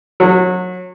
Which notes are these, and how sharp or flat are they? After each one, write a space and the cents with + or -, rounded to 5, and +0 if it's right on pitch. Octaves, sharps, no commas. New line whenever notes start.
F#3 -25